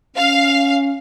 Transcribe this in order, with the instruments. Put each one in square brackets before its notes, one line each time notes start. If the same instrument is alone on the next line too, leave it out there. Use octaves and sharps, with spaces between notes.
[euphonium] C#4 [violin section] F5